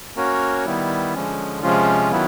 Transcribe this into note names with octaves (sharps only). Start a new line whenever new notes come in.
A#3 C#4 F#4 A#4 C#5
D#3 G3 B3 E4
D3 F3 G#3 C#4
C3 F3 G#3 C#4 F4
D#3 F#3 B3 E4